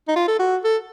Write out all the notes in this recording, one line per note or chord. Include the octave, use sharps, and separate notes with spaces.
D#4
F4
A4
F#4
A4